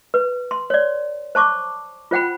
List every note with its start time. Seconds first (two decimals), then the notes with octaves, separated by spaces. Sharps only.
0.14 B4
0.51 C6
0.70 C#5 D5
1.35 C5 A5 C#6 D6
2.11 F4 C5 F#5 G5 B5